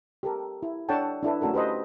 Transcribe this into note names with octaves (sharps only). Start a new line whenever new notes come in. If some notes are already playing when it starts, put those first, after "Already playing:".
G4 A4 A#4
E4
D4 A4 C#5 F#5 G5 A5
D4 E4 A4 B4
A3 C#4 F#4 A4 A#4
G4 B4 C5 D#5